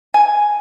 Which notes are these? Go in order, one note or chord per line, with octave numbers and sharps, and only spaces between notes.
G#5